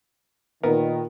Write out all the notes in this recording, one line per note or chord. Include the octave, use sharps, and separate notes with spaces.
A#2 D#3 B3 A#4